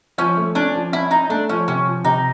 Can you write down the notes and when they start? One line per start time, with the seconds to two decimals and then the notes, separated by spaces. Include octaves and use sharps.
0.18 F3 C#4
0.37 A3
0.55 C#4 D4
0.74 F3
0.92 C#4 E4
1.11 C#4 D#4
1.29 A3 D4
1.49 F3 C#4
1.68 C3 C#4
1.86 F3
2.04 C3 D#4